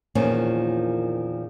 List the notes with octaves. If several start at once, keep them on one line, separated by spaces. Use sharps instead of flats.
E2 A#2 D#3 F3 C#4